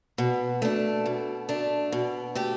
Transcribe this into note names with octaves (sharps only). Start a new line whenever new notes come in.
B2
A3 D4
B2
A3 D4
B2
A3 G4